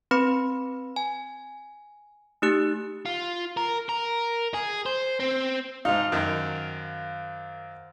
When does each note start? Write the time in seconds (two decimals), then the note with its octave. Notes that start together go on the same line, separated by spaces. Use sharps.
0.11 C4 B4 B5 C6
0.96 G#5
2.42 A3 D#4 G4 F#6
3.06 F4
3.57 A#4
3.89 A#4
4.54 G#4
4.86 C5
5.20 C4
5.85 G#2 D#4 C5 F5
6.12 F#2 D#3